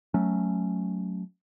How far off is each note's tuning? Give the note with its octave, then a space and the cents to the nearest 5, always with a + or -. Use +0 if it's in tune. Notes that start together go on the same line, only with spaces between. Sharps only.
F#3 +0 A3 -10 C#4 +0